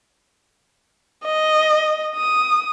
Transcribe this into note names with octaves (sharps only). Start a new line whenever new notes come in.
D#5
D#6